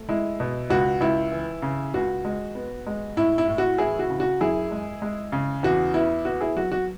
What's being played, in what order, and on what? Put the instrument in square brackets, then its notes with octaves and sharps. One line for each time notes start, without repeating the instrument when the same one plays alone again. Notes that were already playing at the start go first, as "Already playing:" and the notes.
Already playing: [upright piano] A3
G#3 E4
B2
C#2 F#4
C#2 E4
E3
C#3
C#2 F#4
G#3
B3
G#3
A2 E4
E4
A2
F#4
E3 E4 G#4
F#4
C#3
F#4
F#2 E4 G#4
G#3
G#3
C#3
E2 F#4
B3 E4
B3 F#4
E4 G#4
F#3 F#4
F#4